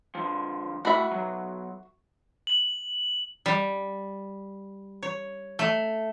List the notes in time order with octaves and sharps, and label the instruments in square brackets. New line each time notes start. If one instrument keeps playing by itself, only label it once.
[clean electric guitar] D3 F3
[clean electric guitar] C2 A2 B5 [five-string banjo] F#4 E5
[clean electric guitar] B1 F#3
[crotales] F#7
[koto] G3
C#5
A3